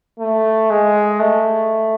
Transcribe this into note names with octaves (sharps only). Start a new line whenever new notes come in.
A3
G#3
A3